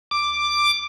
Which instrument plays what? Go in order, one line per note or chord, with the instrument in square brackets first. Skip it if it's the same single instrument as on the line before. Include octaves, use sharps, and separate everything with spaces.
[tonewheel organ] D6